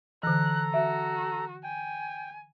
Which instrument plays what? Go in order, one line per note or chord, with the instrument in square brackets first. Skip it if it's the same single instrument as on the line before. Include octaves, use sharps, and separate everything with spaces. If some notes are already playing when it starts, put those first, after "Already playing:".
[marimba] D3 E3 [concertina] A4 A#5 [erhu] F#6
[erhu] F#4 [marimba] E5
[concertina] G5 [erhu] G#5